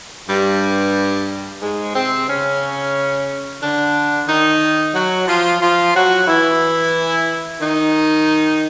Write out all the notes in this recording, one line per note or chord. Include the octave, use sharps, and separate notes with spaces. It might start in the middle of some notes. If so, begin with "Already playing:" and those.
G2 G3
G#2 G#3
C3 C4
C#3 C#4
D3 D4
D#3 D#4
F#3 F#4
F3 F4
F3 F4
F#3 F#4
E3 E4
D#3 D#4